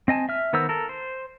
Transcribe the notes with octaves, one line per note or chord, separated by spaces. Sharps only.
C4 D#5 G#5 A5
E5 F6
D#3 B3 A#4 C5 E6
A4 A#4
C5